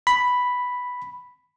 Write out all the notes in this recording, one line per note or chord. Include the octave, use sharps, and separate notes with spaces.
B5